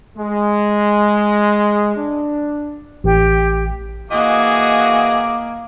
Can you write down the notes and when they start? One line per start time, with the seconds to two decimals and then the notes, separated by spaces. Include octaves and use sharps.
0.16 G#3
1.95 D4
3.04 A1 G4
4.11 E3 A#3 F#4 G#4 D#5 D6